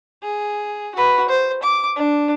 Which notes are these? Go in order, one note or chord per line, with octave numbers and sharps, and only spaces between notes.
G#4
F#4 B4
C5
D6
D4